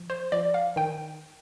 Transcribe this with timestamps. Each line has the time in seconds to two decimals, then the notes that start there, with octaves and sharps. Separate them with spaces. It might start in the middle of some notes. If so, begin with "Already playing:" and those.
Already playing: F3
0.10 C5
0.32 F3 D5
0.54 F5
0.76 D#3 G5